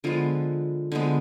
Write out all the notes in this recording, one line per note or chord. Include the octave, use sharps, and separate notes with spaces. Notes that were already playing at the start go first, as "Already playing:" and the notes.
D3 F3 G#3 B3 F4
D3 F3 G#3 B3